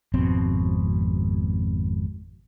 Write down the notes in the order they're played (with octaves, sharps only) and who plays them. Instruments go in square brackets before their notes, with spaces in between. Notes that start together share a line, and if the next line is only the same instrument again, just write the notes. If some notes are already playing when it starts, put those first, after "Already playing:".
[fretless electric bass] G#1 F2 B2 C4